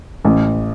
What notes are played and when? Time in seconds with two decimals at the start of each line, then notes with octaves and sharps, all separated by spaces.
0.25 A1